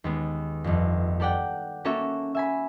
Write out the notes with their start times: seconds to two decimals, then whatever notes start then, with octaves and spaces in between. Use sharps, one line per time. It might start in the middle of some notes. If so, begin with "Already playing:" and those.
0.04 D#2 G#3 B3
0.64 G1 F2
1.20 G4 A4 D5 F#5 G5
1.85 A#3 C#4 F#4 A4 C#5 E5
2.35 E5 G#5 B5